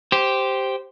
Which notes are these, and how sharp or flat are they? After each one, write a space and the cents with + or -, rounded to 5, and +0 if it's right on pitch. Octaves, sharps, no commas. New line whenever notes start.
G4 -5 C5 +0